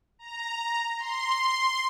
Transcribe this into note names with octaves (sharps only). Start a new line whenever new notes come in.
A#5
C6